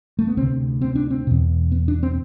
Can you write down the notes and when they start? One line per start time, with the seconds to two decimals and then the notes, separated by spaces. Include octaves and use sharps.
0.19 A3
0.27 B3
0.37 D2 C3 C4
0.81 C4
0.95 D4
1.10 C4
1.27 E2 B2
1.72 B3
1.88 D4
2.03 C4